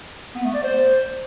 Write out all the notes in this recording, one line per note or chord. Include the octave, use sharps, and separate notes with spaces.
B3
A3
D5
C5